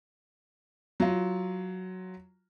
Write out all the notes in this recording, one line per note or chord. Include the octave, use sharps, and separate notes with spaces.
F#3 F4